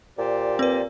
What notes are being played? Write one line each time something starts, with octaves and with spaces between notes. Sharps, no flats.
A#2 G4 C5 D5
C4 B4